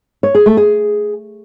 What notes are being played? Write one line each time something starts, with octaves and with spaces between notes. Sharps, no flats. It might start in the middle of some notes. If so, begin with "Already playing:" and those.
C#5
G#4
A3
G#4